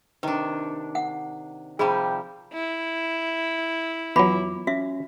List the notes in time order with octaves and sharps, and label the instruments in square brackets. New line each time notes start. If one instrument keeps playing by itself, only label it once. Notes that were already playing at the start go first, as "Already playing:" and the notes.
[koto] C3 D4 [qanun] D#3 [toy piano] B4
[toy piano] F#5
[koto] C3 F3 G3 [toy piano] G#4 D5 B5 [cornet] G5
[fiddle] E4
[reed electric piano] F2 B3 D6 [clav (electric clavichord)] E3 F#3 [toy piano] F4 B5
[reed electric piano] C#4 [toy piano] F#4 E5